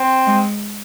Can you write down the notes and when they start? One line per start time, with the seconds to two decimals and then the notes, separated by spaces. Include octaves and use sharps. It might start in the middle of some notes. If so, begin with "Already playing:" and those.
Already playing: C4
0.27 G#3